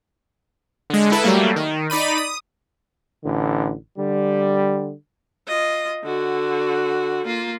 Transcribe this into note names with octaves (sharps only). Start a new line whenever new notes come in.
D3 G#3
E4 A4 B4
F#3 G3 A3 A#3
D#3
D#4 D5 B5 D#7
D#6
A1 D3
D3 G3
F4 D#5
D3 F#4
A#3 F4